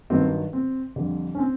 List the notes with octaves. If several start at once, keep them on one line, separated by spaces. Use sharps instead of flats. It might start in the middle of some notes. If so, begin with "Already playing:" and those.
G2 D#3 F#3 C4
C4
F2 D3 G3
C#4
C4